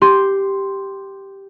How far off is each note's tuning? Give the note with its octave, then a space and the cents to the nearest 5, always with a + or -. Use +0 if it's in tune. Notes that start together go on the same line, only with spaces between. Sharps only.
G4 +0 C6 +0